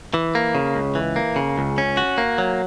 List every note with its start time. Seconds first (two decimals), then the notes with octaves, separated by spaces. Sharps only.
0.14 E3
0.35 A#3
0.55 C#3
0.75 C#2
0.95 E3
1.16 A#3
1.36 C#3
1.58 C#2
1.78 C#4
1.97 F#4
2.18 A#3
2.38 F#3